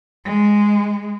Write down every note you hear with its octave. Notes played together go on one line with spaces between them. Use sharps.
G#3